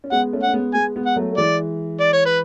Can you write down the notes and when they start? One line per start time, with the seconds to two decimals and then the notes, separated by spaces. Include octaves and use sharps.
0.04 C#4
0.11 G#3 B3 F#5
0.33 A3 C#4
0.43 F#5
0.48 C#4
0.53 G#3 B3
0.74 G#3 B3 G#5
0.96 G#3 B3
1.06 F#5
1.16 F#3 A3
1.32 A3
1.37 E3 G#3 D5
2.00 D5
2.13 C#5
2.26 B4